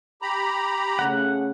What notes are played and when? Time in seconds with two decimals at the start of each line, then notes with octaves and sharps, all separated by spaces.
0.22 G4 A#5 B5
0.99 C#3 A3 F#5